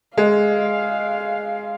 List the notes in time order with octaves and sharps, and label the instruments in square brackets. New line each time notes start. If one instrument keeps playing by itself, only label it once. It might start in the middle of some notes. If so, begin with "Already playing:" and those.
[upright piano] G#3 [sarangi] F5